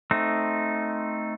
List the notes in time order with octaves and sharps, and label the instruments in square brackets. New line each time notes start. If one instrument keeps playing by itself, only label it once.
[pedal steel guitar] A3 C4 D#4